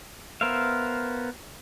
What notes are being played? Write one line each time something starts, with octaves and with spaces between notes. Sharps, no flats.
B3 A#4 C5 E5 F5